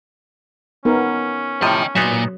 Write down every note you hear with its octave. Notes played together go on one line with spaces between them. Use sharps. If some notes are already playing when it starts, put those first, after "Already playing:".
B3 C#4 D#4 A#4
A2 C3 F3 D#5 G5
A#2 F#3 B3 D#4 E5